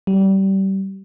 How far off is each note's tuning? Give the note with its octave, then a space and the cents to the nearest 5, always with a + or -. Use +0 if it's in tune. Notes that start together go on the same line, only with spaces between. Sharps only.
G3 -25